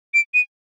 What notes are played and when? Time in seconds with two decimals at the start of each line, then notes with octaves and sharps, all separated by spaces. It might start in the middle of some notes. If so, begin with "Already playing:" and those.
0.14 D7
0.34 D#7